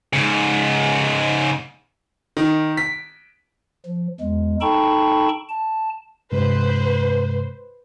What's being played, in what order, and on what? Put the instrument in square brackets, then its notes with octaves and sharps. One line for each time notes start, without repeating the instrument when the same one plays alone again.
[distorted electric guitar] G#2 C#3
[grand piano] D#3
B6
[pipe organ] F3
E2 G#3
D#4 A4 G5 A5 B5 C#6
A5
[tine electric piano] G2 C3 G#3 [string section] B4 C5